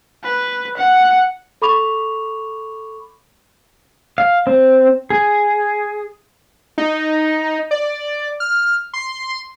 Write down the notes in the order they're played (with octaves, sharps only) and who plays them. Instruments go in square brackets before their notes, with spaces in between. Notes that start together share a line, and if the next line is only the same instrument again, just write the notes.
[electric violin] B4
F#5
[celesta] A4 B5 C#6 D6 F7
[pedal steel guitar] F5
C4
G#4
[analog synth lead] D#4
D5
F6
C6